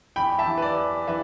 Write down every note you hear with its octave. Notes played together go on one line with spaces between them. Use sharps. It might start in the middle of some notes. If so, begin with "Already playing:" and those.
E2 G5 B5
E5 A5
E3
B4
D5
E2
E3 B4 E5